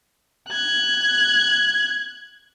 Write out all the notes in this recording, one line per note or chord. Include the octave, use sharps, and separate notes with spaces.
F#6 G#6